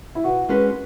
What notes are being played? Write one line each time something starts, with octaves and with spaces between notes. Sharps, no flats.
E4
B2 F#4
G#3 C#4 F#4 B4